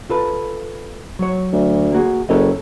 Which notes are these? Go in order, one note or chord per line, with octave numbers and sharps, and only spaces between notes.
F4 A4 B4
F#3 C#5
D2
A#3 F#4 G#4
F#1 A4 C#5 D#5